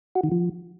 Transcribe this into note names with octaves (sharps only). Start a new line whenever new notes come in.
F#4
D#3
F3